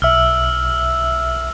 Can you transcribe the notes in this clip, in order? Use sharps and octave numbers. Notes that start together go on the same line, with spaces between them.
B1 E5 E6 F6